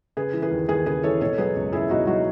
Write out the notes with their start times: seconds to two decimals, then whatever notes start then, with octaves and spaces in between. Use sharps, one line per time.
0.17 C#3 G#4 B4
0.33 E3
0.42 G#4 B4
0.51 D#2
0.68 D#2 G#4 B4
0.86 C#3 G#4 B4
1.03 E3 A4 C#5
1.20 B2 A4 C#5
1.38 F#3 G#4 B4
1.55 C#2
1.72 C#2 E4 G#4
1.90 B2 D#4 F#4
2.07 F#3 D#4 F#4